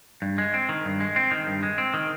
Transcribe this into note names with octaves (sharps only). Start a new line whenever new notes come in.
G2
G#3
C4
D#3
G2
G#3
C4
D#3
G2
G#3
C4
D#3